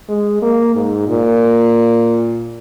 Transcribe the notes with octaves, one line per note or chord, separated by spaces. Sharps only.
G#3
A#3
G#2
A#2